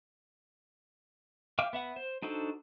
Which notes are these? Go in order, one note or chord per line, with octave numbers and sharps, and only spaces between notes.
E5 F5 G5 D6 F6
B3 E5 F#5
C5
D4 D#4 F#4 A4 C5